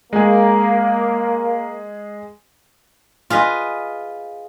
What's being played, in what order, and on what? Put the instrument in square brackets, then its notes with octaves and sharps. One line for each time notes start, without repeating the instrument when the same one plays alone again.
[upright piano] G#3 G#4 [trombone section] A#3
[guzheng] F4 G#4 B4 D#5